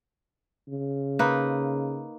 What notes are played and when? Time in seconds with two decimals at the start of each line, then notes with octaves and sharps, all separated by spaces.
0.68 C#3
1.19 A#3 D#4 B4